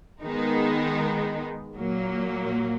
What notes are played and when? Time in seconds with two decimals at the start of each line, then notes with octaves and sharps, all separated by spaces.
0.22 D#3 G#3 B3 D#4
1.76 A#2 F#3 A#3